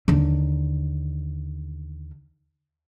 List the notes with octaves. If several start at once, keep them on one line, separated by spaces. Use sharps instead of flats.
D#2 D3